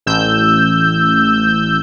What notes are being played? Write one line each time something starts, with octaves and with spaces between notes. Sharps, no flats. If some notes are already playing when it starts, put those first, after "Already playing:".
A1 E6 G6